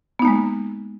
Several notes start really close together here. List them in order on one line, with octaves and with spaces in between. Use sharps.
B3 D#4 A#3 G#3